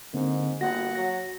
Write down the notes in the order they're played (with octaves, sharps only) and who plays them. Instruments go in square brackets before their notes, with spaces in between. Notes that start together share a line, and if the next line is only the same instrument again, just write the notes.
[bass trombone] G#2 [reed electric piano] D3 A#3 C4
[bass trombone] G1 [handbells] A#3 A#6 [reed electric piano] F#4 [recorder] F#5
[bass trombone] F#3 [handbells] A#6